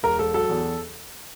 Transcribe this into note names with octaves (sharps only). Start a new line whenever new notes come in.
E1 A#4
E1 A4
F#3 A4
E2